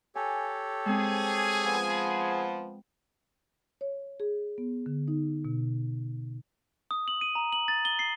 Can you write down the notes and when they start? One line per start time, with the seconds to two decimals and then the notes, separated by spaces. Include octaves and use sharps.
0.15 G4 A4 C#5 G#5
0.85 G#3 C4 G#4 G#5
1.64 F3 B3
3.81 C#5
4.20 G#4
4.58 B3
4.86 D3
5.08 D#4
5.45 B2
6.91 D#6
7.08 F#7
7.21 D#7
7.35 A#5
7.52 F#7
7.68 A6
7.85 G7
7.99 C7